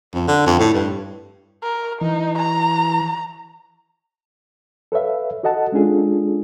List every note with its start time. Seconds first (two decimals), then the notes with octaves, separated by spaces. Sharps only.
0.14 F2
0.28 D3
0.46 F2
0.60 A2
0.74 G2
1.63 A#4
2.01 E3 D#4
2.38 A#5
4.92 A4 B4 C#5 E5 F5
5.43 F#4 A4 D#5 F#5 A5
5.72 G#3 C#4 D4 F4 G#4 A4